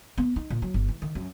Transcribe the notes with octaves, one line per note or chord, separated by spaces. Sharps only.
B3
D#4
A#2
F#3
G1
E3
D#3
F#2